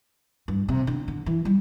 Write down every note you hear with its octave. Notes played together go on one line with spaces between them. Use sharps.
G2
C3
D3
D3
E3
G3